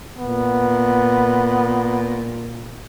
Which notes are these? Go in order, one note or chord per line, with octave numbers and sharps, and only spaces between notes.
A#2 B3